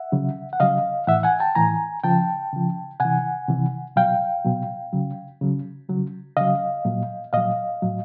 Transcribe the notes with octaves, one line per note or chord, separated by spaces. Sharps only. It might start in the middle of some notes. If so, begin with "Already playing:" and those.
Already playing: E5 F#5
C#3 F#3
F#5
C#3 F#3 D#5 F5
A2 E3 E5 F#5
F#5 G#5
G5 A5
A2 E3 G#5 A#5
C#3 F3 G5 A5
C#3 F3
C3 E3 F#5 G#5
C3 E3
B2 F#3 F5 G5
B2 F#3
C#3 F#3
C#3 F#3
C#3 F#3
C#3 F#3 D#5 F5
A#2 F#3
A#2 F#3 D#5 F5
A2 F#3